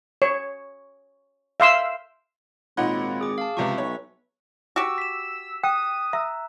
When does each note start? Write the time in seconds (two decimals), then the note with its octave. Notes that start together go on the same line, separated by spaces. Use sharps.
0.22 C#5
1.60 E5 F5 C6 E6
2.77 G#1 A#2 D#4 F4 C#5 F#5 B5
3.21 G#4 D6
3.38 F5 A5
3.57 C#2 C3 F3 B4 E5 C#6
3.78 B1 C#5
4.76 F#4 G4 E6
4.98 B6 E7
5.63 G5 D#6 F#6
6.13 E5 A#5 E6